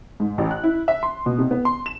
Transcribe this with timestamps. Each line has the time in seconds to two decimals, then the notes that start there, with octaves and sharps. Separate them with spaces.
0.20 G#2
0.38 A1
0.51 F#6
0.63 E4
0.88 E5
1.03 C6
1.26 B2
1.38 C3
1.51 B3
1.65 C6
1.86 E7